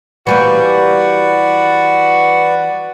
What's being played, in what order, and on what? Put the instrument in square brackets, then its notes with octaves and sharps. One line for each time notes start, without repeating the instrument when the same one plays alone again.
[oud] E3 G3 A#3 [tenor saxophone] F#4 [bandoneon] B4 D5